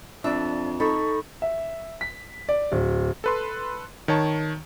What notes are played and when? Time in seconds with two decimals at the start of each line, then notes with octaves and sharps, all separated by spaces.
0.24 F2 D4 D5 E5
0.80 D#4 A4 B5 C#6 A6
1.42 E5
2.01 B6
2.49 D5
2.72 D1
3.24 A4 B4 C6
4.08 D#3 C#5 A5